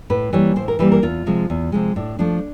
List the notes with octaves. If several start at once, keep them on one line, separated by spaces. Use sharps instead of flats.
A2 B4
E3 G3 A#3 C#5
A2 C5
A#4
E3 G3 A#3 B4
A#4
E2 F4
C3 F3 G#3
E2
C3 F3 G#3
A2 D4
F3 A3 D4